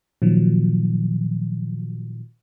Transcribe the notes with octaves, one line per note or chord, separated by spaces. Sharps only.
A#2 D#3 F3 F#3